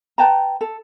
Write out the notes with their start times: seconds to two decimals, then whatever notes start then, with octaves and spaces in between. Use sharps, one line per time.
0.18 B4 G5 A5 A#5
0.61 A4